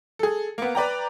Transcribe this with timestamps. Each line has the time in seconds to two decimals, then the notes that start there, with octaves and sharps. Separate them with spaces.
0.19 G#4 A4
0.58 A#3 B3
0.75 B4 D5 G5 A#5